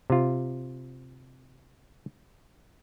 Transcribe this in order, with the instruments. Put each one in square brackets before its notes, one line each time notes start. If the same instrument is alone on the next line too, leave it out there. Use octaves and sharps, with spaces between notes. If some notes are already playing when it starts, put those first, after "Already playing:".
[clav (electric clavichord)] C3 F4